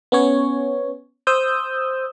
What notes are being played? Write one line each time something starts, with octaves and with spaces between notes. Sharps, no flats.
B3 C#4 C#5
C5 D#6 E6 G6